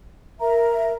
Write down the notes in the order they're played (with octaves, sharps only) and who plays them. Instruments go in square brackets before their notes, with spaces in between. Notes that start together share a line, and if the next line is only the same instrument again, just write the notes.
[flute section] A#4 E5 A#5